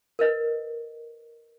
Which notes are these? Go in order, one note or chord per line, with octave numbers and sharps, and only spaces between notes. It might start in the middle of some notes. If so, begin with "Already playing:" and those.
A#4 B4 D#5